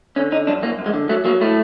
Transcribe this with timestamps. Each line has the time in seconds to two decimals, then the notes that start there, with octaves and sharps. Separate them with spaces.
0.16 D3 C#4
0.32 D3 D#4
0.47 F#2 D4
0.62 F#2 A#3
0.79 F#2
0.86 G#3
0.94 D3
1.09 F#3 A3
1.25 F#3 A#3
1.41 A2 A3